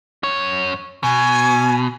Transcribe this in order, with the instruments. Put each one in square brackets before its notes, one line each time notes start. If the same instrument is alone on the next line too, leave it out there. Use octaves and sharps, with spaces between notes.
[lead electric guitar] F#2 C#5
[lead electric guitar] B2 [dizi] G#5